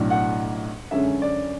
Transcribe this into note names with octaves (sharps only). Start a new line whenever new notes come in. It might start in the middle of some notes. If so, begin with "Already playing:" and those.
Already playing: B1 A2 F#3 A3 D4
F#5
F#2 D3 G#3 C#4 E5
D5